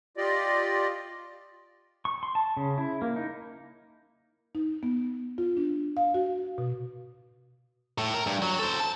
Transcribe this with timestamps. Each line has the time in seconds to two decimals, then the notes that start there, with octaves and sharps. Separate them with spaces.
0.17 F4 G4 D5 D#5
2.05 C#6
2.23 C6
2.35 A5
2.57 C#3
2.78 E4
3.02 A#3
3.16 D#4
4.55 D#4
4.83 B3
5.38 F4
5.57 D4
5.97 F5
6.14 F#4
6.58 B2
7.98 A2
8.14 A#4
8.27 G2
8.42 F#3
8.59 A4 C5
8.80 A5